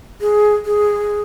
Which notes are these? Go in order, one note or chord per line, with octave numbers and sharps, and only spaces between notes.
G#4
G#4